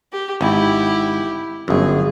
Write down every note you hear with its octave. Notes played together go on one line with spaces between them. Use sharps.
G4
G#1 E4 G4
G1 F#2 G#4